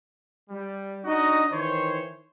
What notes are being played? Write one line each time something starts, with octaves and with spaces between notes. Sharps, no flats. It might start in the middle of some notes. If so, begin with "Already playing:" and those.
G3
D4 D#4 F#4 D#5
D#3 E3 C5 C#5